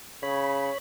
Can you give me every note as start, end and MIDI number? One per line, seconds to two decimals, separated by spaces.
0.23 0.69 49
0.23 0.78 73
0.23 0.78 83